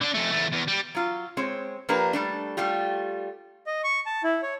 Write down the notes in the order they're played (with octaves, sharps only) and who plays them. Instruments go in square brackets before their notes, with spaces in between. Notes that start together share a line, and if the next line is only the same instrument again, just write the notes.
[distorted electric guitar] D3 D4
F2 A3
E2 A3
E2
G3
[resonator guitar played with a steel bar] F#3 F4
G#3 C4 C#5
F3 A#3 D4 G4 A#4 B4
G3 A3 D4
G3 A3 F4 G4
[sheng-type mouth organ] D#5
C#6
A5
E4
C#5